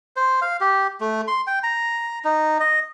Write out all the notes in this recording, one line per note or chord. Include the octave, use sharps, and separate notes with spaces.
C5
F5
G4
A3
C6
G5
A#5
D#4
D#5